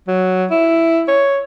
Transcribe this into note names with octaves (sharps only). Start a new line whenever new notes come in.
F#3
E4
C#5